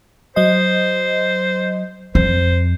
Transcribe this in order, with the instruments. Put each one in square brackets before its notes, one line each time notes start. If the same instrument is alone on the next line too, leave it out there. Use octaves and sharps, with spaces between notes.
[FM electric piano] F#3 D#5 [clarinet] C5
[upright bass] F2 [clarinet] C5